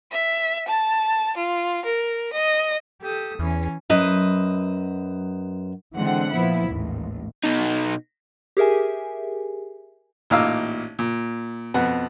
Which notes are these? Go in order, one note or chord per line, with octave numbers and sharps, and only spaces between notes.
E5
A5
F4
A#4
D#5
G4 A4 D#6
E2 E3 C#4
F#2 F#3 B4 C5 D#5
D3 E3 G#3 C4 F#5
A#2 F3 B3 E4
A1 D#2 G#2
B2 D#4
G4 G#4 A#4 E5 G#5
A1 A#2 D#4 F5 D6 E6
A#2
F2 B2 B4 F#5